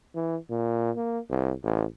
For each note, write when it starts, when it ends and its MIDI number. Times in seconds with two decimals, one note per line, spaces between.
0.15 0.36 52
0.50 0.91 46
0.96 1.19 58
1.30 1.52 36
1.63 1.84 33